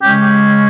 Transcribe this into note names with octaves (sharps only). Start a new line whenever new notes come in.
C#3 G#3 C#4 G4